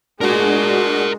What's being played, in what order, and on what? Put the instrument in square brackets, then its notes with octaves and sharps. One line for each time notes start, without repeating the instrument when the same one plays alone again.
[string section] G#3 [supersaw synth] D4 F#4 [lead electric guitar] A#4 D5